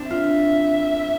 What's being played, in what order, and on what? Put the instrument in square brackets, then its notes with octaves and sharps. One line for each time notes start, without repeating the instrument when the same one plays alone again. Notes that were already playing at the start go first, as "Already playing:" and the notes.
Already playing: [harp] C4 D4
[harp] F4 [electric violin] E5